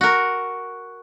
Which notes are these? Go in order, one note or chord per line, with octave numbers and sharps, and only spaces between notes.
F#4 A#4